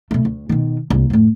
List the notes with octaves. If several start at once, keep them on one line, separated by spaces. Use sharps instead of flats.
B2 A3
D2
B2 D#3
C2 A#3
F2 A2